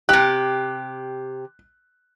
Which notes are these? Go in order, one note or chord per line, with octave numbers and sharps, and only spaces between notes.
C3 G4 F#6